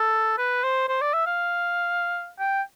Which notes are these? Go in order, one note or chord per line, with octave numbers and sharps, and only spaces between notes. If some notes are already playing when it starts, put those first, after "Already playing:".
Already playing: A4
B4
C5
C5
D5
E5
F5
G5